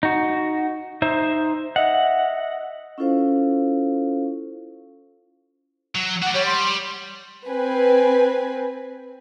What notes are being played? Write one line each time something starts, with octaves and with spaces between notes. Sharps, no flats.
D#4 F#4
D#4 C5 E5
D#5 E5 F#5
C#4 E4 F4 A4 C5 F5
F#3
F#4 D5 F#5
G3 C#5
C6
C4 B4 G#5